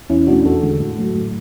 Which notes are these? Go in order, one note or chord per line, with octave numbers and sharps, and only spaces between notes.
E2 C#4 E4
B2 A3 D4 F#4
E2 F#4 A4
D3 G#3
A2
F#3 A3
A2